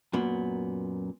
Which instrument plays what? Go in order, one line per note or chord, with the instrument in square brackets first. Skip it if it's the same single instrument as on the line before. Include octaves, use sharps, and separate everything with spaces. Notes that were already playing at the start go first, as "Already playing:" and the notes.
[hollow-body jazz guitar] F#2 A#2 B3